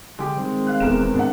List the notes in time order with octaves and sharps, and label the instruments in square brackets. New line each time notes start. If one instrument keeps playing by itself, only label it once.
[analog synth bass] D3 [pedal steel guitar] G#3 G4
[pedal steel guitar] D#3 G#3 C4 [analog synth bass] G3
[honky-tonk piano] F5 F#6
[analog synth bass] E1 [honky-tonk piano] E2 A#4 E7
[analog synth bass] G#2 [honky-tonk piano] D4 F#5